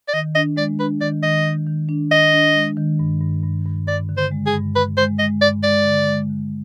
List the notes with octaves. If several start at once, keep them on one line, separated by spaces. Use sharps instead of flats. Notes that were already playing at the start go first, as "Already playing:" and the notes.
D5
D#3 D#5
D4 D#5
G#3 D5
D4 B4
D#3 D5
D#3 D#5
D#3
D#3
D4
D#3 D#5
D4
G#3
D#3
G2
G2
G2
G2
G2 D5
D3
C5
G#3
G#4
G2
G2 B4
G#3 C5
G#3 D#5
G2 D5
G#3 D5
D3
G#3
D3